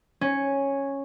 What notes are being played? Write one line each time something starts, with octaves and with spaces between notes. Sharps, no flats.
C#4